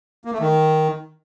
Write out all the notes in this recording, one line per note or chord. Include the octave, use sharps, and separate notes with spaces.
A#3
A3
D#3